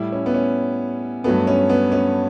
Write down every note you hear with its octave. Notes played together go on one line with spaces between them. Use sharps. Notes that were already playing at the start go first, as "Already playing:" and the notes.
Already playing: A2 G3 E4
C#4
B3
C#4
G2 F#3 A3 B3
C#4
B3
C#4